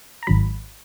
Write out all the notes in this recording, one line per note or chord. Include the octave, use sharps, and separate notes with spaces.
A#5
G#1 G#2 D#3 F#3 B5